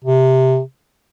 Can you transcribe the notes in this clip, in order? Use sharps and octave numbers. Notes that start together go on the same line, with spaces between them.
C3